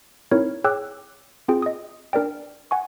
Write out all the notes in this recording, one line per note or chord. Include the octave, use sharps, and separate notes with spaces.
C4 D#4 E4 A#4 C#5
G#4 C#5 G5 D6 E6 F#6
C4 F4 G#4 G5
D#5 D#6
D4 A#4 D5 G5
F#5 G#5 C#6